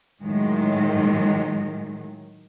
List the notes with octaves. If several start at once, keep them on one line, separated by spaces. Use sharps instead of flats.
A2 D#3 F#3 G#3